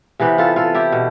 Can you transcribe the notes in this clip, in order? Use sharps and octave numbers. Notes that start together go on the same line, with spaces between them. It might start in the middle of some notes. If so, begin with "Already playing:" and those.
C3 E3 B3 G4 B4
F4 A4
F4 A4
E4 G4
B2